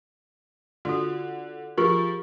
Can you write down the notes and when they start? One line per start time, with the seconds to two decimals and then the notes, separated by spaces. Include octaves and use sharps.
0.85 D3 F4 F#4
1.78 F3 F4 G4 G#4 A#4